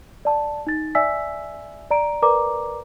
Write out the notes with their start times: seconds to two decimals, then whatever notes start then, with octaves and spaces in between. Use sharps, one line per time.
0.25 D5 A5
0.67 D#4 A6
0.95 D5 E5 G#5 E6 B6
1.91 D5 A#5 D7
2.22 A#4 B4 D5 A#5 D6